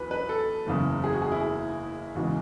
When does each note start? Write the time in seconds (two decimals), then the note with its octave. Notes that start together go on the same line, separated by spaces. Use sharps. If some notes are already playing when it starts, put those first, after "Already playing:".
Already playing: E2 F#3 B4
0.11 B4
0.29 A4
0.67 F#1 E2 C#3
1.04 G#4
1.13 F#4
1.22 G#4
1.32 E4
1.41 G#4
2.15 E2 C#3 E3 G#3 F#4